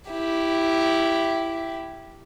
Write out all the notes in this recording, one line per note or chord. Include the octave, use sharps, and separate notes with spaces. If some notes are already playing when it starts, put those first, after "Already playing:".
E4 G4